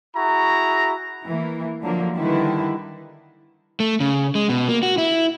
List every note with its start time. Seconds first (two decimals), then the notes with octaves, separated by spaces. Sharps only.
0.16 E4 F#4 G#4 A#5 C#6
1.25 E3 A#3
1.82 D3 F3 F#3 A#3
2.15 D3 D#3 G3 E4 B4
3.80 A3
4.00 C#3
4.35 G#3
4.49 B2
4.68 A#3
4.83 F#4
4.98 E4